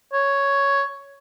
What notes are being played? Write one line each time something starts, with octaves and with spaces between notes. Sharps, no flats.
C#5